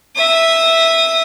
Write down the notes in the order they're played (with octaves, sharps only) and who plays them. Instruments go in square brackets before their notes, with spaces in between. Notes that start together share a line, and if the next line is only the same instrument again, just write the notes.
[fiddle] E5 D#6